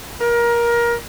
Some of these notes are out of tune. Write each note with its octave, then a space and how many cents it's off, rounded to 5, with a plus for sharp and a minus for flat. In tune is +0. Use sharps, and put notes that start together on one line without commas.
A#4 +20